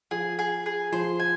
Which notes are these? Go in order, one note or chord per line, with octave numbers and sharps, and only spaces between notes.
F3 G#4
G#4
G#4
F3 C5
G#5